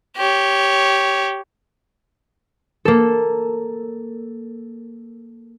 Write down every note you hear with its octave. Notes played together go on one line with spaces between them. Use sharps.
G4 C#5
A#3 A4